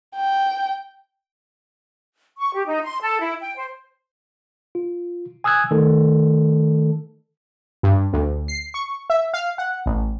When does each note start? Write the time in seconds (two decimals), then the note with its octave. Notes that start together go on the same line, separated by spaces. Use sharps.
0.16 G5
2.37 C#6
2.54 G4
2.67 D#4
2.83 C6
3.01 A4
3.20 E4
3.41 G5
3.56 C5
4.75 F4
5.44 G#5 D#6 E6 F#6 G#6
5.71 D#3 A3 A4
7.83 G2
8.13 D2
8.48 C7
8.74 C#6
9.10 E5
9.34 F5
9.58 F#5
9.86 A1